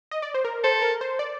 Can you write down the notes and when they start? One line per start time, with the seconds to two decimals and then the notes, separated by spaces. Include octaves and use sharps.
0.11 D#5
0.22 D5
0.34 C5
0.45 A#4
0.64 A4 C5
0.82 A#4
1.01 C5
1.19 D5